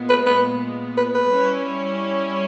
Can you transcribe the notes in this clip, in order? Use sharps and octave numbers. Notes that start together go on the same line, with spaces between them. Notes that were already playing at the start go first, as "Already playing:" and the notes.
Already playing: A#2 G#3 B3
B4
B4
B4
B4
G3 C#4 E4